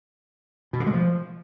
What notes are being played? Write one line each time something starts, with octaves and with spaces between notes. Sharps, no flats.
B2
D3
G#3
F3